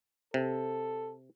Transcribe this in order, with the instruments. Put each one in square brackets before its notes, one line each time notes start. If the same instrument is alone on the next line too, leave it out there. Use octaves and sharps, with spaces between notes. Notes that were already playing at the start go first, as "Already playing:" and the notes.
[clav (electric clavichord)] C3 [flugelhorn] A4